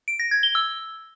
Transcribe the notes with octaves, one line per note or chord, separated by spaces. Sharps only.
D7
A#6
G#6
G7
E6